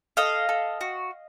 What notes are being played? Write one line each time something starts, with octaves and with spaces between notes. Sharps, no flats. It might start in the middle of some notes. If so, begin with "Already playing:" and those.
A4 D#5 F5
A4
F#4